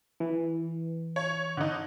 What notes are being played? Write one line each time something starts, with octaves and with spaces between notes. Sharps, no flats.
E3
C#5
D3 D#4